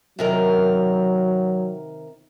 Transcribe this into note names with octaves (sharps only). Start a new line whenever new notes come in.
C3 D#3 F#3 A#4